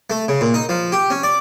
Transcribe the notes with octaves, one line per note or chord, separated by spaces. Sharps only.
A3
C#3
A#2
D#4
F3
G4
C#4
D5